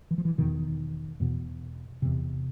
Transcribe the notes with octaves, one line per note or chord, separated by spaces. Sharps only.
E3
F3
E3
E2 B2 D#3
E2 B2
E2 C3